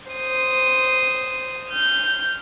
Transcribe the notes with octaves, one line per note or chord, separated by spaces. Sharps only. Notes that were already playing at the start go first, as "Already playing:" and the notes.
C5 D#6
F6 G6